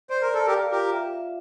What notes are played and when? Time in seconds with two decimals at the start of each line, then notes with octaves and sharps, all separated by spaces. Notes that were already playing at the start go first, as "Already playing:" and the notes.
0.10 C5 D5
0.22 A#4
0.30 A4 D5
0.47 G4 A#4
0.51 F5
0.72 F4 G4 A#4
0.93 E5
1.13 E5